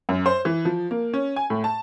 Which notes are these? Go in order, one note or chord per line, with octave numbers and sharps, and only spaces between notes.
F#2
C5
E3
F3
A#3
C#4
G#5
A2
A5